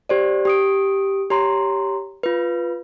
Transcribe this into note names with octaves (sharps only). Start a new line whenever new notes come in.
G4 C5 D5
G4 D#6 D7
G4 C#5 A#5 C6
F4 B4